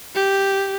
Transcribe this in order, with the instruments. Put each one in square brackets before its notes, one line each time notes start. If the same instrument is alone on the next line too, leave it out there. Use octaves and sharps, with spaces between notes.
[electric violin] G4